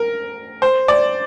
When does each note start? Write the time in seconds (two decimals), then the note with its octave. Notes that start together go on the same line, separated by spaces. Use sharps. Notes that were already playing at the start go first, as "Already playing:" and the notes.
Already playing: A#4
0.62 C5
0.88 D5